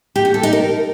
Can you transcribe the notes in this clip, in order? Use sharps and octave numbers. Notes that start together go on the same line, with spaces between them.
G4
F#4
A4
D#4
A#4